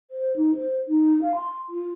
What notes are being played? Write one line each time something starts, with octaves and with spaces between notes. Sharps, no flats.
C5
D#4
C5
D#4
F5
C6
F4